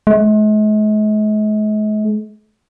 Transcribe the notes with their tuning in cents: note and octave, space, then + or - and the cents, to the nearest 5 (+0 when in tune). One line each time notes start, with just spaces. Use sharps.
G#3 +45